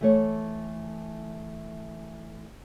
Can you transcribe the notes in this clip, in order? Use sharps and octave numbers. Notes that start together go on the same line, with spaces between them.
E3 A3 C#5